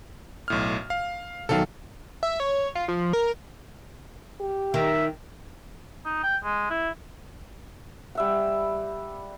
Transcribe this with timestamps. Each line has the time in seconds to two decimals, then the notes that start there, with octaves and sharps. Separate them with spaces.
0.48 B1 A2 F6
0.90 F5
1.49 B2 D#3 F#3 A4 F5
2.23 E5
2.40 C#5
2.75 F4
2.88 F3
3.13 A#4
4.40 G4
4.74 D#3 E5
6.05 D#4
6.23 G5
6.43 G#3
6.70 E4
8.15 G3 E5 F#5